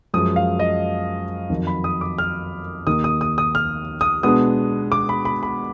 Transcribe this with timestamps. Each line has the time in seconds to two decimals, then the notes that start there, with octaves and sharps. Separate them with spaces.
0.14 F#2 F3 G#3 D#6
0.36 F5
0.59 D#5
1.50 F2 D#3 F#3
1.67 B5
1.84 D#6
2.01 D6
2.18 F6
2.86 D#2 D#3 A#3 D#4 D#6
3.04 D#6
3.21 D#6
3.38 D#6
3.55 F6
4.01 D#6
4.23 B2 G#3 B3 D4 D#6
4.92 D6
5.09 B5
5.25 B5
5.43 B5